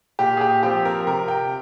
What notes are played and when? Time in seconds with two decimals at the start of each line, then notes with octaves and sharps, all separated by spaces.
0.19 A#2 G4
0.37 G#4
0.41 G4
0.63 F3 C4 G4
0.85 A#4
1.07 C3 A#4
1.28 G5